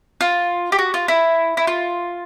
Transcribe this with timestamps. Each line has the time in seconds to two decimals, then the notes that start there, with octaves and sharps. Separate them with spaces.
0.21 F4
0.72 G4
0.79 F#4
0.94 F4
1.08 E4
1.57 E4
1.67 F4